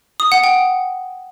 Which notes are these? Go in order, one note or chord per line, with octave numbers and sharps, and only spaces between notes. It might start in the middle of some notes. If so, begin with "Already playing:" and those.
D#6
F#5
G5